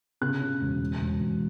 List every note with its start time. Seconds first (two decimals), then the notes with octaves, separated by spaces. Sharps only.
0.21 C#3 F#6
0.41 C#3
0.61 E1
0.80 E1
1.01 E1
1.20 E1